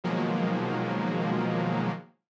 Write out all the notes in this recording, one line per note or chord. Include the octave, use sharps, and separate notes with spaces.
B2 D#3 F3 F#3 G#3 A#3